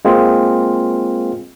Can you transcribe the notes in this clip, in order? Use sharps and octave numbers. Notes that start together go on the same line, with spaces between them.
G#3 A#3 C4 F4